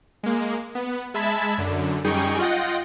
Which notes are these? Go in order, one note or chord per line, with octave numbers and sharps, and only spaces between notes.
G#3 A#3
B3
G#3 E5 A5 B5 G#6 E7
F#2 D3
F#2 G3 D#4 G#4 G5 C#6
F4 D#5 F#5 G5 A#6